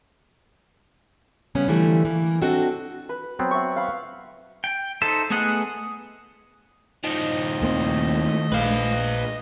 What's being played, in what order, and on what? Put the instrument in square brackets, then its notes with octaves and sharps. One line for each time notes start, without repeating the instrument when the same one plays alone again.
[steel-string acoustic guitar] C#3 G3 B3 C#4
D3 E3 F3 G3 A3 E4
E3 A#3
C4 D4 F#4 A4 D#5
[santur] B4
[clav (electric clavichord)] F#3 B3 C4
[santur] E5 F#5 C#6
F5 B5
[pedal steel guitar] G5
D#4 A4 C5 E5
A3 B3 G#4 D#5 F#5
[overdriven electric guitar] D#3 F3 [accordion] D#5
[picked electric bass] D#2 A#3 C4 [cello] A3
[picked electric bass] A#1 [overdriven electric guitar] B4 F5